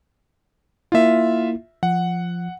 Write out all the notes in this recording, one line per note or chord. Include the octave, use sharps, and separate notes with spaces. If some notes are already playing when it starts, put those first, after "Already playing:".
A#3 E4 F4 E5
F3 F#5